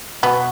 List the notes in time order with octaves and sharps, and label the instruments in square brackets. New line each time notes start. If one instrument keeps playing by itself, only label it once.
[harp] B2 [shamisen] B3